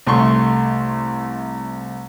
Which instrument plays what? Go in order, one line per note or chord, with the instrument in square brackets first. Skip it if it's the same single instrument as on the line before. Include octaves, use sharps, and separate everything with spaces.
[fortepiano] C2 A3 C6 C#6